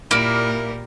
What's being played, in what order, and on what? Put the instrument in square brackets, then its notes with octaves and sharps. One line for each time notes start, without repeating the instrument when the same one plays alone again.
[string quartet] A#2 G3 A#4 [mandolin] A#3 E4